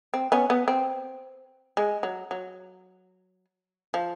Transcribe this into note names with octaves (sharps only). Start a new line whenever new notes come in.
C4
B3 C#4
B3
C4
G#3
F#3
F#3
F3